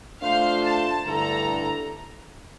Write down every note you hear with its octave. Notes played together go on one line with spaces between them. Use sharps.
A3 D4 F4 C5 F5
A5
G2 D3 A3 E4 A4 A#5